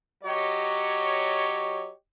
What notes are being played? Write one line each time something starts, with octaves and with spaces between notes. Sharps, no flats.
F#3 G4 C#5 D#5